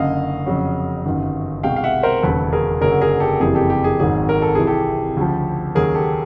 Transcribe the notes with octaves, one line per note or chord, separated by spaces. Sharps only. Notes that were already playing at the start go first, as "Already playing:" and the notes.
Already playing: F#1 F#2 D3 D#5 F5
F2 C#3 F#3
G1 F#2 D#3 F#3
C2 B2 G#3 F5 G5
F5
E5 F#5
A#4 C5
E1 D#2 C#3 F#3 A4 B4
G#4 A#4
F#1 F#2 D3 F#3 G#4 A#4
G#4 A#4
G4 A4
F#1 F2 C3 E3 G3 G#4
G4 A4
G4
G#4
G#1 G#2 D#3 F#3 G#4
A#4
A4
C2 C3 E3 G#4
G4 A4
D2 C#3 F3
D#2 C#3 F#3 G#4 A#4
G4 A4